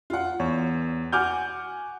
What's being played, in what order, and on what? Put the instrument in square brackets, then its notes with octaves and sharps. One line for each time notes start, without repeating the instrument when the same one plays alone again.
[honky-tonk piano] F4 F#5
[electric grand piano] E2 [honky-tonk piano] C#5
[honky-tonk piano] F#4 F#5 G#5 [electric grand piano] D6 F6 G6